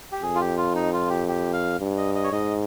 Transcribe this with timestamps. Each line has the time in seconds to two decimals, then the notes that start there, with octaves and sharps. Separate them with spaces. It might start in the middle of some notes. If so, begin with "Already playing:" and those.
0.12 G4
0.22 F2 G#4
0.35 F4
0.40 G4
0.57 F4
0.75 D#4
0.93 F4
1.10 G4
1.28 G4
1.53 F5
1.79 G2
1.97 D#5
2.15 D#5
2.24 C#5
2.32 G#2 D#5